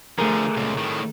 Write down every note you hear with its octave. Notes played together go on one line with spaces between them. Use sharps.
D3 F3 A3 G#4 A#4
C#2 A#2
A2 D#3